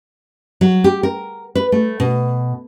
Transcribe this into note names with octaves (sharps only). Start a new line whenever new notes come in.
F#3
G4
A#4
B4
A3
B2